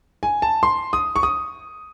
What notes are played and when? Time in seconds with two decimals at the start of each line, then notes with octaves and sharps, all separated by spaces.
0.23 G#5
0.42 A5
0.63 C6
0.93 D#6
1.16 C#6
1.23 D#6